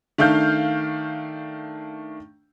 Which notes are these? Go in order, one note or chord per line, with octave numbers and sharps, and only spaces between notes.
D#3 A3 D4 F5 F6 G6